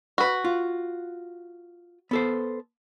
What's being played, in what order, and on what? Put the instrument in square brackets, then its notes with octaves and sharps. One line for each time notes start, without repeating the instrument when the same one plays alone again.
[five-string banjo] F#4 B4
[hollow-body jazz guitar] F4
B3 A4 C5